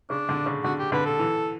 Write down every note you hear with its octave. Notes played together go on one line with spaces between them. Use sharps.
C#3 D4
D3
C#3
D3 F#4
G4
D3 B4
A4
E3